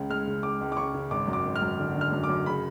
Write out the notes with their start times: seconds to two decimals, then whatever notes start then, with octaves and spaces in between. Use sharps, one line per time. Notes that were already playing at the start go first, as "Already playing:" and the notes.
Already playing: C#2 C#3
0.09 G#3 F6
0.27 C#3
0.43 C#2 D6
0.61 C#2
0.72 D6
0.77 C#3 C#6
0.94 C#3
1.11 G#1 D6
1.27 F#2
1.33 D6
1.45 G#1
1.56 F6
1.61 F#2
1.79 D3
1.95 D3
2.01 F6
2.12 F#2
2.23 D6
2.29 F#2
2.46 C#3 B5